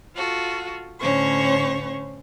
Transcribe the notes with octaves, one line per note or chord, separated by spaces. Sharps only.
F4 F#4 A4
A2 D3 C#4 C5 C#5 C#6